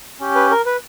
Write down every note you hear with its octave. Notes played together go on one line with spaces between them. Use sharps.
C#4 G4
B4
A#4
B4